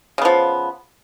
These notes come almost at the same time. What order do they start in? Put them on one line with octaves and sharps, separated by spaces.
C#3 B3 F3